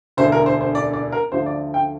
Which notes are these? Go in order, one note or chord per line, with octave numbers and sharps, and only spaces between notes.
E1 D2 D3 C5
A#4
C5
C5
D5
D5
A#4
D2 D3 F3 C5
D5
G5